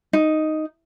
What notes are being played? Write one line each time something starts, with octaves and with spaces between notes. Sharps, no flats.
D#4